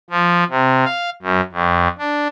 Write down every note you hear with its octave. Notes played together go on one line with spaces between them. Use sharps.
F3
C3
F5
F#2
F2
D4